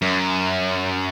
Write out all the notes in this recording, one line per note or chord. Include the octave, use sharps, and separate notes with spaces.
F#2